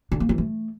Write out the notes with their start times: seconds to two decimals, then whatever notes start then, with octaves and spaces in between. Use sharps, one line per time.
0.12 D3
0.20 A#3
0.29 E3
0.38 A3